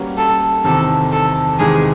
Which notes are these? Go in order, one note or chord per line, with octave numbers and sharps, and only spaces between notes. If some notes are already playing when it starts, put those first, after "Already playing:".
Already playing: G3 A#3 C#4 F#4 B4
A4
E2 C3 D#3 A4
A4
E2 C3 D#3 G#3 G#4